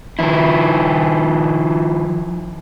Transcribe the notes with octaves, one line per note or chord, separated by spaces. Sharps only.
D#3 F3 E4